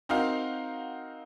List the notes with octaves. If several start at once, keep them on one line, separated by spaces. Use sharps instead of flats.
C4 D#4 F#4 A#4 F5